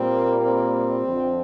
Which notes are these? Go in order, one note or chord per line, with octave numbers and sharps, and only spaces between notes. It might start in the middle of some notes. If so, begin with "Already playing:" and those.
Already playing: A#2 G3 A#3 C4
C4
F2 D3 F3